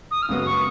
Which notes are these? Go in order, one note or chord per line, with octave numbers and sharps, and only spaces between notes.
D#6
F6
F#2 C#3 G#3 B3 F#4 D#6
C#6